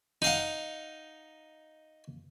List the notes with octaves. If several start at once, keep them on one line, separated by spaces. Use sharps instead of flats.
D#4 F5 F#5